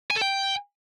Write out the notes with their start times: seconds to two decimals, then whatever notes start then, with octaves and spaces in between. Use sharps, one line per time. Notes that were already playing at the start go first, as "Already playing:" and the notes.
0.11 G#5
0.16 A4
0.22 G5